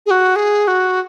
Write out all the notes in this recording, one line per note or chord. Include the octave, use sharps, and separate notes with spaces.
G#4
F#4
G#4
F#4